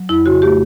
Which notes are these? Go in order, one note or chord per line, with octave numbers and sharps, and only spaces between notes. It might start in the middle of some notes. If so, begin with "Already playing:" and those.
Already playing: F#3
F2 E4
C#3 F#4
A3 G4